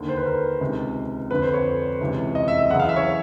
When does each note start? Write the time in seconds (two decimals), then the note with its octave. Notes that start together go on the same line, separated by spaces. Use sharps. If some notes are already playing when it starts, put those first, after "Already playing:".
Already playing: D#2 D3
0.09 C5
0.17 B4
0.26 A#4
0.61 C#2 C3 D#3
1.30 F2 D3 B4
1.42 C5
1.53 C#5
2.01 C#2 C3 E3
2.35 D#5
2.48 E5
2.59 E5
2.70 F#2 C#3 E3 F#5
2.80 F5
2.89 E5
2.96 C#5